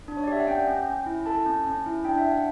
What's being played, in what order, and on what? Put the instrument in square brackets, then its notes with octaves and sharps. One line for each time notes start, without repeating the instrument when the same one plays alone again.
[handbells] D4
C#5
D5
G4
E5
F#5
C#4 G5
C#4
C#4
E4
A4 A5
C#4
C#4
E4
D4 G5
E5
D4
F#5